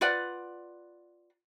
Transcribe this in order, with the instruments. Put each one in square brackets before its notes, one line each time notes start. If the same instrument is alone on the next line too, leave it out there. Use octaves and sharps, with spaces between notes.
[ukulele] F4 B4 D5 F#5